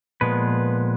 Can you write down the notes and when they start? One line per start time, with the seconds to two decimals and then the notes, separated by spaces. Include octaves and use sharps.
0.21 A#2 F3 G#3 B3 B4